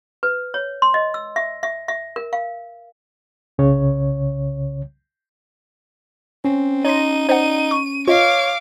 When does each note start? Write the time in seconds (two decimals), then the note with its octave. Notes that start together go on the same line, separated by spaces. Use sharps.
0.23 B4
0.54 C#5
0.82 C6
0.94 D#5
1.14 E6
1.36 E5
1.63 E5
1.88 E5
2.16 A#4
2.33 F5
3.58 C2 C#3 C#5
6.45 C4 C#4
6.85 D#4 C#5 C6 A#6 D#7
7.29 D#4 C5 D5 F#5
7.71 C#6
8.08 F4 C#5 D#5 F5 D6